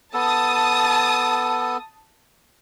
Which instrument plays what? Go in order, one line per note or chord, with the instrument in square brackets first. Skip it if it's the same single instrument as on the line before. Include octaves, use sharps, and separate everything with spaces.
[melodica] B3 A4 [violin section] A5 D#6